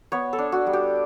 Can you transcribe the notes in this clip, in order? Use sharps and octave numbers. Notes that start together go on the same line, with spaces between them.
B3 C#5
A4
D4
F#4
G3
G4